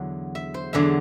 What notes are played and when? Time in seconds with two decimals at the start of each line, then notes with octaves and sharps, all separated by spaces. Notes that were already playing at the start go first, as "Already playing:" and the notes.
Already playing: E2 D3 F#3
0.35 E5
0.54 C5
0.73 E2 D3 F#3 E5